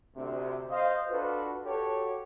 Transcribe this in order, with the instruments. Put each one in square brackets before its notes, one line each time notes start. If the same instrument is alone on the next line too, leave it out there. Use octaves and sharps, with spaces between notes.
[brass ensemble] D2 C3
C5 D#5 F5
D4 F4 F#4 A4 B4
F#4 G4 A4 C#5